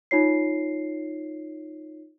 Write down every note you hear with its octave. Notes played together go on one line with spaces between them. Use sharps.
D#4 F4 C#5 C7